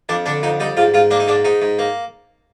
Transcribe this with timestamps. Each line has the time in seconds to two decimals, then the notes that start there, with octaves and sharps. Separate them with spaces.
0.09 F2 D4
0.26 D3 D4
0.43 F2 D#4
0.60 G3 D#4
0.77 G#2 F4
0.94 G#2 F4
1.11 A#3 D4
1.20 D#4
1.28 G#2 D4
1.45 G#2 D#4
1.62 G#2
1.79 A#3